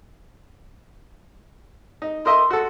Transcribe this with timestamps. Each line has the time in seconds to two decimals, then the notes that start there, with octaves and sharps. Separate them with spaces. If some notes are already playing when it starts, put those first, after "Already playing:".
2.02 D#4
2.26 A#4 D#5 E5 C6
2.51 F#4 A4